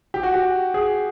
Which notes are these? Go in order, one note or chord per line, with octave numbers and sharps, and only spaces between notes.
G4
F#4
G4
G#4